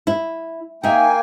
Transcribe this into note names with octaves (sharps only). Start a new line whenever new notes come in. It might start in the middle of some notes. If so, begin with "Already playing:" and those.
E4
A#3 D#4 E5 G5 G#5